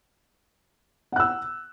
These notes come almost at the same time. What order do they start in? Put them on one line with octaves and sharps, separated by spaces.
F#5 F#6 E6